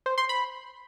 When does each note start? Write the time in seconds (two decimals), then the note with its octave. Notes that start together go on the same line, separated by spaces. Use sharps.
0.06 C5
0.18 C6
0.29 B5